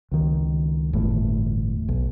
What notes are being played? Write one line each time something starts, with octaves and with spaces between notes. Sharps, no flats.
C#2 D#3
G1 E2 A2
B1